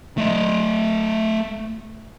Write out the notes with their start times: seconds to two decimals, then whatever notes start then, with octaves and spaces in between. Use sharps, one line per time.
0.18 A3 D#5